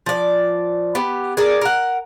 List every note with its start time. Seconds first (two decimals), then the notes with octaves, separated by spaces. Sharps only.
0.06 F3 D5
0.95 B3 G4
1.37 G#4 A#4 D5
1.61 A#4 F#5